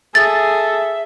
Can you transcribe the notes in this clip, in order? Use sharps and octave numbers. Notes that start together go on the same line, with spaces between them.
G#4 A4 E5 A6